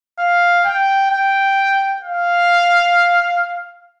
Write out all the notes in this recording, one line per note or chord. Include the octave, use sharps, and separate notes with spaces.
F5
G5
G5
F5